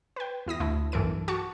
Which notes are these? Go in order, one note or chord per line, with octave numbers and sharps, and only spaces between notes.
B4 G5
E2 E4 D#6 A#6
D2 A3 E4
B1 G2 E3 A4 A#4 D7
F#4 A5 C#6 D6